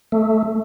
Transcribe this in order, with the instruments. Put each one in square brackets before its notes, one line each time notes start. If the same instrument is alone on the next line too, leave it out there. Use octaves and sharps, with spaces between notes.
[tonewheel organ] A3